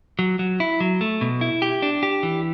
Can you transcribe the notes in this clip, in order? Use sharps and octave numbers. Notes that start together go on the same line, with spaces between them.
F#3
F#3
E4
F#3
A3
B2
E4
G4
D4
G4
E3